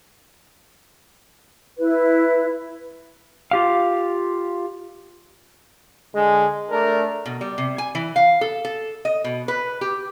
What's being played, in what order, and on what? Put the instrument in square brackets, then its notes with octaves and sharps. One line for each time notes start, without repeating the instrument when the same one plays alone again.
[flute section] E4 B4
[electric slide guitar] F4 G4 F5
[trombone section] D3 G#3
A3 D4 A#4
[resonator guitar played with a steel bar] B2
G3
C3
G#5
E3
F5
A4
A4
D#5
B2
B4
G4